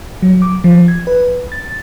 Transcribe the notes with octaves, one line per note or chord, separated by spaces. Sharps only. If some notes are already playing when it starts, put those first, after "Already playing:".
F#3
D6
F3
G#6
B4
A6